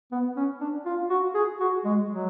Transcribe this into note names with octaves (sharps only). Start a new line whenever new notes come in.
B3
C#4
D4
F4
F#4
G#4
F#4
G#3
F#3